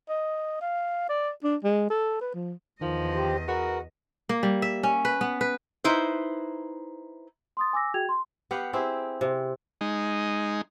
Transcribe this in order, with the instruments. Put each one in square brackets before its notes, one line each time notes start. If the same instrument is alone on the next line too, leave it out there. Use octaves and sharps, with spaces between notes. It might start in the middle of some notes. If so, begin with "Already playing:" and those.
[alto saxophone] D#5
F5
D5
D4
G#3
A4
B4
F3
[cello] E2 D#5 [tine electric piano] D#3 [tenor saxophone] F3
[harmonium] G4 C5
[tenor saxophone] F#4 [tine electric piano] G#4 B4 [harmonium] A#4
[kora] A#3
G3
E5
C#4
B4
B3
B4
[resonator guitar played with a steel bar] D#4 E4 B4 C5
[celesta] C6 D#6 A6
G#5 D6 E6 A#6
F#4 G#4 G5 G#6 F7
C6
[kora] B3 G4 F5 F#5
C4 E4 G4 G#4
C3
[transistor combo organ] G#3 D#4